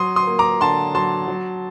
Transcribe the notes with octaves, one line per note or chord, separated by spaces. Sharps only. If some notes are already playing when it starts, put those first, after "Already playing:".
Already playing: F#3 C6 D#6
C6 D#6
A#3
A#5 D6
D3 A5 C6
F#3 A5 C6
F#3